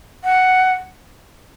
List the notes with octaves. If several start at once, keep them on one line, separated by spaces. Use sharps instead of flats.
F#5